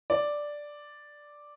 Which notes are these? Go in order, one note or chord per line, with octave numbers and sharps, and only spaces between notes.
D5